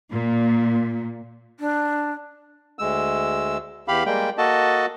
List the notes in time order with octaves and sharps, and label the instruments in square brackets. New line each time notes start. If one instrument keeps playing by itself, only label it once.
[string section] A#2
[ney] D4
[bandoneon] D2 G#3 E6
E2 G4 F5 B5
G3 G#3 A#3 G5
A#3 F#4 A4 D#5 A5